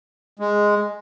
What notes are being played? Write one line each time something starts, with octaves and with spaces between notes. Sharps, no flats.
G#3